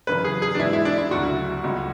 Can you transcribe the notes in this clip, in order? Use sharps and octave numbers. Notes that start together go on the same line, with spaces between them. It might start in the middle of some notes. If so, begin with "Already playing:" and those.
F#2 C#3 E3 B4
G#4
G#4
D4
G#2 E3 E4
E4
D4
E4
D2 C#3 F#3 F#4
C#2 C#3 F#3